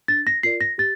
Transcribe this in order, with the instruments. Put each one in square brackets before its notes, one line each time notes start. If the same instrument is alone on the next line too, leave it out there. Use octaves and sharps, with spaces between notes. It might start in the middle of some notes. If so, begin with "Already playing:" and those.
[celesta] D4 A6
A#6
F4 A#4 D5 C7
A#6
G4 A6